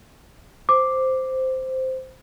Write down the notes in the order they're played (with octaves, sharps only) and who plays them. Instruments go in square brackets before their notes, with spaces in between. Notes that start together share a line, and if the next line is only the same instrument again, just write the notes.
[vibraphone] C5 [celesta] D6